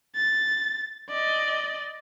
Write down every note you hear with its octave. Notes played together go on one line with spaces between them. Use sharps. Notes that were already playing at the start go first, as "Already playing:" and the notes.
A6
D5 D#5